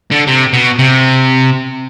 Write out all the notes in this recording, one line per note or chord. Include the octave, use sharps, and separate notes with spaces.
D3
C3
B2
C3